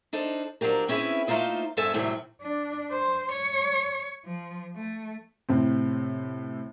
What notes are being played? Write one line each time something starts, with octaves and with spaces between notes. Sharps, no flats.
D4 D#4 A4 C5
F3 F#3 D4 G4 A#4
C4 C#4 E4 G#4 B4
A3 A#3 D#4 F4 C5 D#5
G2 B3 C4 A4 E5 G#5
F#2 A2 C3 E3 F#3 G3
D4
C5
C#5
F3
A3
A2 C3 C4